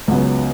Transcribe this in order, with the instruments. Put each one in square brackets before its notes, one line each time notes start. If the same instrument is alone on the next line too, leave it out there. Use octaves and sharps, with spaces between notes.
[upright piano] C#2 C#3 F#3 B3